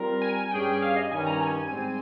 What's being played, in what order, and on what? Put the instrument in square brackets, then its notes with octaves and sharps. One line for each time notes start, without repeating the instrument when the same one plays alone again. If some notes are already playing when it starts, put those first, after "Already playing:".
Already playing: [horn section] G3 C4 F4 A#4
[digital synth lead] G#5
[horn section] G2 G3 C#4 G#4 [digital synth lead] G5
[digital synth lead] F5
D#5
[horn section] G2 D#3 G3 C#4 [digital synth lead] G#5
[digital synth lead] A#5
G#5
[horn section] G#2 G3 C4